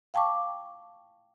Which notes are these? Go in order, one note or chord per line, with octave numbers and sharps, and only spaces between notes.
F5 G5 A5 C#6 D6